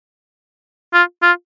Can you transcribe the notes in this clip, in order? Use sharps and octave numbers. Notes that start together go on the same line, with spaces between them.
F4
F4